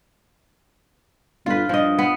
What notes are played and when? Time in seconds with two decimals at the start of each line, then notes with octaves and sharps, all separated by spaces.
1.46 G1 F4 B4
1.69 G2 F3 D#5
1.99 B3